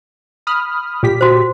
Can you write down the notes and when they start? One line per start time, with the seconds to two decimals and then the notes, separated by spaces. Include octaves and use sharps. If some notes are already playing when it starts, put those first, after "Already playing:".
0.47 B5 D#6 F6
1.03 A#2 G4 B6
1.21 F#4 C5